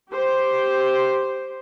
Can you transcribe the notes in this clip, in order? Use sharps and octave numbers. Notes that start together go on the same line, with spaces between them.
G4 C5